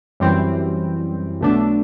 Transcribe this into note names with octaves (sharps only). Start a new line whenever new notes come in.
F#2 E3 G3 C4
B1 B2 A3 D4